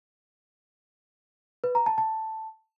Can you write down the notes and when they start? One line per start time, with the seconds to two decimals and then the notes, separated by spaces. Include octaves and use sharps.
1.64 B4
1.75 A#5
1.86 A5
1.98 A5